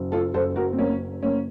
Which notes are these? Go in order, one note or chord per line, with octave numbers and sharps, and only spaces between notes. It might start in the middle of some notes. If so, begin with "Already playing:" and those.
Already playing: F#1
F4 A4
F#1 A4 C5
F#4 A#4
C4
F#1 A#3 C#4
F#1 A#3 C#4